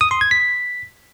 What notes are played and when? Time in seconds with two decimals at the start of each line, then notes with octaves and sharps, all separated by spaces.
0.01 D#6
0.11 C6
0.21 G#6
0.31 B6